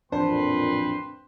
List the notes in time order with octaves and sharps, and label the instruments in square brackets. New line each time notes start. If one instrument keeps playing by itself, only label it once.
[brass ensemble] A1 F2 A#2 [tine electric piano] D4 [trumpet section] B4 G5 C6 [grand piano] C5